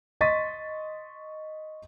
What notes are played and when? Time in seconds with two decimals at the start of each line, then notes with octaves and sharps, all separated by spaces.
0.21 D#5 C6 C#6 A6 B6 D#7